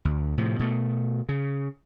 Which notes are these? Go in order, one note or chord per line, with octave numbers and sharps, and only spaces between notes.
D2
A2 C3 F3
B2 A3
C#3